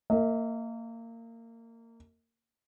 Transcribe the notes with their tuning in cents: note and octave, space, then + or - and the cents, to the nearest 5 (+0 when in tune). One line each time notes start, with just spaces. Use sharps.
A#3 -25 D#5 +40